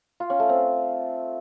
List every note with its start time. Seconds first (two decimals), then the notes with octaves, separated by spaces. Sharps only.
0.20 F4
0.30 C#4
0.40 A3
0.49 C4